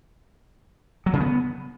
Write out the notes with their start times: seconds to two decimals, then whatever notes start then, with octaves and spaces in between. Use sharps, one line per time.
1.06 F#3
1.13 C#3
1.20 B3